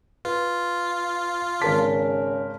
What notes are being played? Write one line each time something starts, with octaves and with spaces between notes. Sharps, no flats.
F4 B4
G#1 C#3 A#4 A5 B6